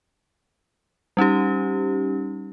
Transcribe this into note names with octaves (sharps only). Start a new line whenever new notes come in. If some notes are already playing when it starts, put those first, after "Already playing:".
G3 C#4 D#4 G4